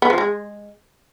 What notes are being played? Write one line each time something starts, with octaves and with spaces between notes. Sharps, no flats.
B3
F3
G#3